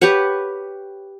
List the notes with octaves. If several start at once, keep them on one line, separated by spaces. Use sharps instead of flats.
G4 B4 C#5 F#5